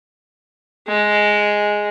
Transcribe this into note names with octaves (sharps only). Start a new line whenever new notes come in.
G#3